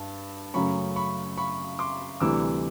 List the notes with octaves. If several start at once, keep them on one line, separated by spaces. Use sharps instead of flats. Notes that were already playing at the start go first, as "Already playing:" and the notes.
Already playing: G2 A5
F#2 C#3 F#3 A3 C#4 B5 C#6
B5 C#6
B5 C#6
C6 D6
D2 C3 E3 G3 D6 E6